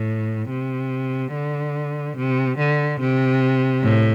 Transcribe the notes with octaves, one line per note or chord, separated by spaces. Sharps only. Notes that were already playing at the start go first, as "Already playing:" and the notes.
Already playing: A2
C3
D3
C3
D3
C3
A2